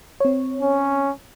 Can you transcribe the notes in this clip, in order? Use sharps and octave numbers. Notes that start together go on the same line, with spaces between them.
C4 C#5
C#4